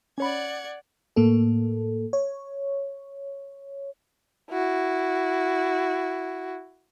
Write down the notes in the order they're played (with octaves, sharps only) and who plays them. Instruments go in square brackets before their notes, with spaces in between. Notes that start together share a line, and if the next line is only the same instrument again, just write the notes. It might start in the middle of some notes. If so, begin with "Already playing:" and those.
[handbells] C#4 C#5 B5 [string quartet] D5 F#5 G#6
[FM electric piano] A2 A#3 A4
C#5
[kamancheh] E4 F#4